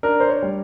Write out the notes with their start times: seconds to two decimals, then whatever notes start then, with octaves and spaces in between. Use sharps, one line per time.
0.03 D4 A#4
0.20 C5
0.29 C#5
0.42 G3